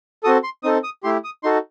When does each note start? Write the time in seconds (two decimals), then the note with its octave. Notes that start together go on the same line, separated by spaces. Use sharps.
0.23 C4 F#4 A4 D#6
0.43 C6
0.63 C4 D#4 A4 D#6
0.84 D#6
1.03 A3 E4 G4 C6
1.24 D#6
1.43 D#4 F#4 A4 C6